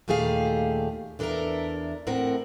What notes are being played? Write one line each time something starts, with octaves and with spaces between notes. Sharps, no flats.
D#2 A#2 A3 G4 G#4 F5
E2 D4 A4 A#4 E5 A#5
A2 C4 A#4 F#5